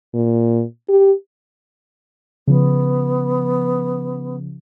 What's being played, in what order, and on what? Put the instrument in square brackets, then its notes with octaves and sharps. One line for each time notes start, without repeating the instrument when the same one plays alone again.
[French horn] A#2
G4
[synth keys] C#3 F3 [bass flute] B3